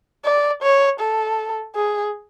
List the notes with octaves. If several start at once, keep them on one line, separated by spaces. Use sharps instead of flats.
D5
C#5
A4
G#4